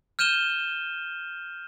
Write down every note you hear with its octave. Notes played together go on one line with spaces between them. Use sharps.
F6 G6 D#7 E7 G7